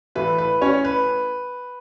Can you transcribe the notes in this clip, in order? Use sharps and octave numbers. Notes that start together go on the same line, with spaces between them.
A2 E3 A3 B4
B4
C#4 C#5
B4